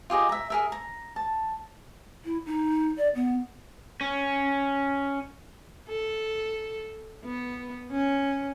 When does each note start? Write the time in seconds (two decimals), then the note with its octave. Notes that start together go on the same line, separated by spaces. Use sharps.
0.10 F4 G4 G#4 D#5
0.29 E5 A#5
0.50 G#4 A#4 E5
0.72 A#5
1.16 A5
2.25 E4
2.46 D#4
2.97 D5
3.15 B3
4.01 C#4
5.89 A4
7.25 B3
7.92 C#4